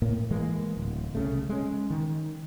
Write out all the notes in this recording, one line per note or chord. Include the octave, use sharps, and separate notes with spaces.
A2 A#3
E3 G#3 A#3
D1
C2 C#3 A3
G#3 C#4
D#3